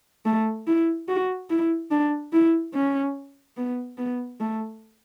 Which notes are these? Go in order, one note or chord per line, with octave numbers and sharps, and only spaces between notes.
A3
E4
F#4
E4
D4
E4
C#4
B3
B3
A3